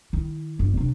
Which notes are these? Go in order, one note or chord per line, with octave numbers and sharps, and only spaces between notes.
D#3 E4
G1 D3
C3 D4